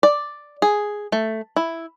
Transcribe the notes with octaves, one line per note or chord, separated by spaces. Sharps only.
D5
G#4
A3
E4